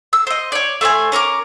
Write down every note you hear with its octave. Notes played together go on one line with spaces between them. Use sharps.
E6
C5 D#5
C#5 D5
A3 C5 E5 G#5
C#4 A#4 C#6 D6